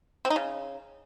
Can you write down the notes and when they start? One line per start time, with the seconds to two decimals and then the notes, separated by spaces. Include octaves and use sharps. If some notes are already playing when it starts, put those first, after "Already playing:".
0.25 C4
0.30 D#4
0.36 C#3